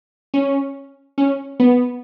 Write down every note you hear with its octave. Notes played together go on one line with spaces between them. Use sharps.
C#4
C#4
B3